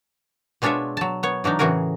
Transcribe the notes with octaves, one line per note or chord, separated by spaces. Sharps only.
B2 G#3 D4 F4 C#5 E5
F#3 A5
B3 C#5
E3 F#3 D4 D#4
A2 C#3 E3 F#4 G#4 A#4